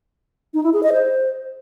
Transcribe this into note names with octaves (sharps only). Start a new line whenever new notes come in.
D#4
E4
G#4
D#5
C5